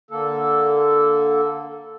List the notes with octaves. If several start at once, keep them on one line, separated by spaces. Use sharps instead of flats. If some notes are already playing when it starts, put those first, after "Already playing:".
D3 A#3 A4